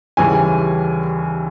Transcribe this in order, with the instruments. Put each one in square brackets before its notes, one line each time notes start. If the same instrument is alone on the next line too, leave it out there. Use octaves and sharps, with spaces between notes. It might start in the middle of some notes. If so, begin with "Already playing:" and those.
[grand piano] D#2 C#3 E3 G3 G#5